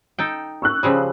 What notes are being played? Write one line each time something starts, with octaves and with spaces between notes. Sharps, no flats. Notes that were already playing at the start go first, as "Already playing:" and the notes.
D#4 A4 G5
C#6 E6 F#6
C#3 F3 G3 D#6